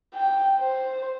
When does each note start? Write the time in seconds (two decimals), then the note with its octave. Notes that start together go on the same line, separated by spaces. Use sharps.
0.14 G5
0.59 C5